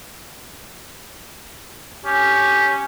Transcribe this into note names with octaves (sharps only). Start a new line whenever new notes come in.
C#4 G4